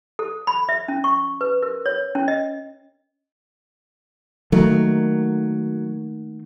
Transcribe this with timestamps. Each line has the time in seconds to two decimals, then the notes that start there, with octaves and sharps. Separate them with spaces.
0.19 A4
0.47 B5
0.69 E5
0.88 C#4
1.04 C#6
1.41 B4
1.63 A#4
1.86 C#5
2.15 C#4
2.28 D#5
4.52 D#3 F#3 A3 A#3